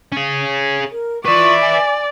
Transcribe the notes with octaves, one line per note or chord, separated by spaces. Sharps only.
C#4 G#4
A#4
F4 B4 D5 E5 C#6
G#5